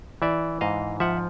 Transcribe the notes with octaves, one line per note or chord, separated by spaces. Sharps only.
E3 D5 E5
G#2 D#5 F5
F3 E5 F#5